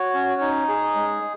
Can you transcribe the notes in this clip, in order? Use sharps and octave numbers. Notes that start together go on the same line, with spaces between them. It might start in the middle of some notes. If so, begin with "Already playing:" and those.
Already playing: F#4 C#5
C#4
D#4
G#4
G#3